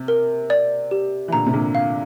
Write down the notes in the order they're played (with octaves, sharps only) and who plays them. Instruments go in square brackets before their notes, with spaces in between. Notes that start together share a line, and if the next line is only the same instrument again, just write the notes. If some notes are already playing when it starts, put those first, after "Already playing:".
Already playing: [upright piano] C3
[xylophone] A#4
D5
G4
[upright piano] E3
[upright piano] A#2 D3 [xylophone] A#5
[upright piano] C3
A#2 D3
[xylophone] F5